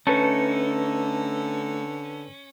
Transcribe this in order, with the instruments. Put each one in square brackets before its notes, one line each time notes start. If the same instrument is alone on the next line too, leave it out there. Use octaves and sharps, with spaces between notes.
[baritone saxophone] D3 [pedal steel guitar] A3 D#4 A4 [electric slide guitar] C#4 [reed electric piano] B4 A5